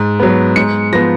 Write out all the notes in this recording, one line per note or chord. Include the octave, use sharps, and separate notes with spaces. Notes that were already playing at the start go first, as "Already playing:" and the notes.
Already playing: G#2
F#3 B3
G#2 C#7
F3 B3 A#6